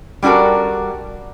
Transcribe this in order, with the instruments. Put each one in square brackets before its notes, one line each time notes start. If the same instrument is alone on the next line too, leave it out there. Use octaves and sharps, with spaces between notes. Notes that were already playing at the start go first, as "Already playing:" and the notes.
[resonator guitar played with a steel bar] G3 D4 F#4 A4 A#4